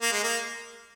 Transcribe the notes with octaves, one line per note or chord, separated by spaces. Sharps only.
A#3
G#3
A#3